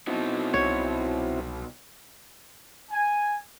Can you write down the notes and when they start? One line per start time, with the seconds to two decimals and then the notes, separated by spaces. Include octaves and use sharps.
0.07 B2 C4 D#4 E4 F#4
0.54 C2 C#5
2.91 G#5